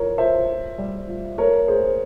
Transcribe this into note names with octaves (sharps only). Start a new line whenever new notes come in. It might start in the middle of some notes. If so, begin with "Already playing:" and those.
Already playing: E3 F4 A#4 C#5
F4 C5 E5
F4
G3
F4
A#3 A#4 C#5
A#3 G#4 C5